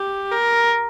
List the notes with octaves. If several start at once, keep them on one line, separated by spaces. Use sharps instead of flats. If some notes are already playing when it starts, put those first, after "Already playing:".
Already playing: G4
A#4